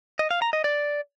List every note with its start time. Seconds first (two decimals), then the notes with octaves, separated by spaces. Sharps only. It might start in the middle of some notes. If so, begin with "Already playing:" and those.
0.19 D#5
0.31 F5
0.42 A#5
0.53 D#5
0.64 D5